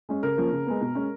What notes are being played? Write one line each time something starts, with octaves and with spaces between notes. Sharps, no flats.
G#3 C#4
C#3 A#4
F3 A#3 C#4
C#3
G#3 B3
B2
G#3 C#4